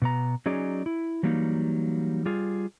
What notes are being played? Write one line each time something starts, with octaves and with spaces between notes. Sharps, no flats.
B2 B3 A#5
F#3 C#4 D#4 G#4 D5
E4
E3 F#3 G3 A#3 D#4
G3 F4 G#4